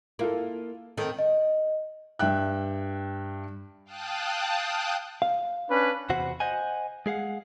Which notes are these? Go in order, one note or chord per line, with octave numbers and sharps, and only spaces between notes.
A#3 E4 F4 A4
D#3 C4 A4
D#5
G2 E5 G5 F#6
F5 G5 A5 D#6 F#6
F5
C#4 D4 B4
E2 C3 F#4 C5 F#5
C5 D#5 F#5 G#5
G#3 G#4 F5 F#5